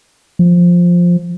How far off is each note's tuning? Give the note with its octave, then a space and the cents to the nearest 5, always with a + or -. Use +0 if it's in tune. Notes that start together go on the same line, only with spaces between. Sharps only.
F3 +5